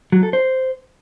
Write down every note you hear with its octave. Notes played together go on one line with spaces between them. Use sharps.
F#3
A4
C5